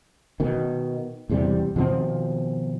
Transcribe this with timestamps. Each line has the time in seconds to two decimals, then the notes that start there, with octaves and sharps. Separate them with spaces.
0.40 B2 D#3
1.29 E1 E2 C3 G3
1.76 B2 D#3 F3 C4